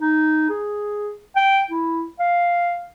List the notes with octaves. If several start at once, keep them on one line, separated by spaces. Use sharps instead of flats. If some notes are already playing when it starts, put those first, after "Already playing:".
D#4
G#4
G5
E4
F5